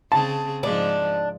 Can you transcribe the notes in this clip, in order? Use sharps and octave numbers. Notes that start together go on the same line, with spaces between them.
C#3 C4 G#4 A5
G#2 F3 D4